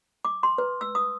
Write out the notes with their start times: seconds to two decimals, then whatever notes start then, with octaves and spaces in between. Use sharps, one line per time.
0.25 D6
0.43 C6
0.58 B4
0.81 E6
0.95 D#6